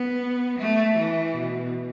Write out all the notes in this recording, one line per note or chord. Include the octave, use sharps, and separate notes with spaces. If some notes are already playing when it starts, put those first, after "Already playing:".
Already playing: B3
A3
E3
B2